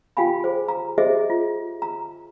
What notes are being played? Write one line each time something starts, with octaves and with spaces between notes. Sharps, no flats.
F4 G4 F5 G5 G#5 B5
G#4 C5
A#5
G4 G#4 C5 D#5 E5
F4
A#5